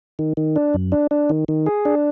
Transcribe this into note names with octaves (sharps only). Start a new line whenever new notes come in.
D#3
D#3
D4
F#2
D4
D4
D#3
D#3
G#4
D4